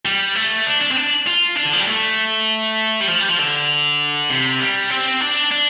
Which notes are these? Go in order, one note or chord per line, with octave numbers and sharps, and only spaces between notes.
G3
A3
D4
D4
C4
D4
F4
D4
D3
F3
G3
A3
G3
F3
G3
F3
D3
C3
G3
C4
D4
D4